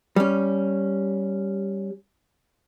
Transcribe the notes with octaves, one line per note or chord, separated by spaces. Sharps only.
G3 C#4